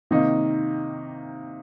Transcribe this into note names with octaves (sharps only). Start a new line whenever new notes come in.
C3 D#3 A#3 D#4